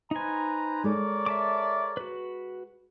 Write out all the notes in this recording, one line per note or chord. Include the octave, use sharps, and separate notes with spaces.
D#4 B4 C5 G#5 A#5
G#3 A4 A#4 C#5 D5
E5 A5 D6
F#4 B4